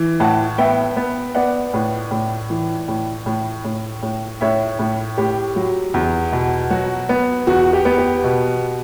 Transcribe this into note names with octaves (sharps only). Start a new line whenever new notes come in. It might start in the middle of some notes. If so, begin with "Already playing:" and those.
Already playing: E3
A2 F#5 A5
B3 E5 G5
B3
B3 D5 F#5
A2
A2
E3
A2
A2
A2
A2
A2 C#5 E5
A2
A2 G4
F#3
E2
B2
F#3 F#4
B3
E2 F#4
G4
B3
G4
B2